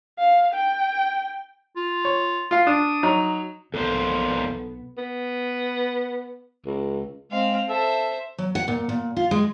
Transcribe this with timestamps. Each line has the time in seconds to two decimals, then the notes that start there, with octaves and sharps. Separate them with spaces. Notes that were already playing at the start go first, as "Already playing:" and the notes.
0.18 F5
0.54 G5
1.77 F4
2.05 C#5
2.51 F4 F5
2.67 D4 D#6
3.03 F#3 D#4
3.74 B1 E2 A#3 B3 A4 C5
4.98 B3
6.66 C#2
7.32 G#3 C4 F5
7.69 A4 C5 E5
8.38 F#3
8.55 F#5
8.68 A#2
8.89 A#2
9.17 F4
9.31 G#3